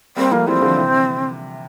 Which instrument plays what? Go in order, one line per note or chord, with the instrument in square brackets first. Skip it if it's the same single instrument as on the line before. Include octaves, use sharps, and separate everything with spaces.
[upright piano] G3 A#3 [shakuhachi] C4
[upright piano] F3 A3 [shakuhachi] A#3
[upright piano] E3 G3 [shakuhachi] C4
[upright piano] D3 F3
C3 E3